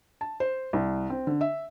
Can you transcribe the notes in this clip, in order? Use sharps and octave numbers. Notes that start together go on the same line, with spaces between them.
A5
C5
C2
C4
D3
E5